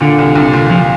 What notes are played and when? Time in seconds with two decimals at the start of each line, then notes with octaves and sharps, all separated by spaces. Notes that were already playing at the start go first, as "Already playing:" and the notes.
0.01 A#2 D3
0.19 C2
0.35 C2 D3
0.53 A#2
0.70 A#2 F3